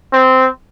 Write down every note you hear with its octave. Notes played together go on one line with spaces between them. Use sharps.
C4